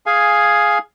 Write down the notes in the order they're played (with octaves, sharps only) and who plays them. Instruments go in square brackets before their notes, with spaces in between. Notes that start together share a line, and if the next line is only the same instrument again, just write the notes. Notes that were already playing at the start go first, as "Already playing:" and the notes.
[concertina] G#4 F5 G#5